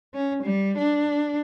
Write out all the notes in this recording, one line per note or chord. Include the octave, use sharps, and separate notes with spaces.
C#4
G3
D4